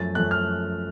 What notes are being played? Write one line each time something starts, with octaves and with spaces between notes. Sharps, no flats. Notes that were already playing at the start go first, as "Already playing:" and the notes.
Already playing: F#2 F3 A3 A6
F#2 F3 A3 F#6
F6